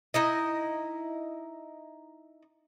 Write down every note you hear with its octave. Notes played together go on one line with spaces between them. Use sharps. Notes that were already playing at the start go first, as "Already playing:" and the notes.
D#4 E4 D#5